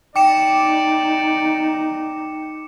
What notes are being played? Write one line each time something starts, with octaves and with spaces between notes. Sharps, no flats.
D#4 D5 G5 D6 C#7 E7